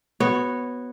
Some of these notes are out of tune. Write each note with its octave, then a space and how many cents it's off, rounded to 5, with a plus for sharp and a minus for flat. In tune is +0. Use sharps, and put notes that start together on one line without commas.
B3 +0 F#4 +0 C#5 -10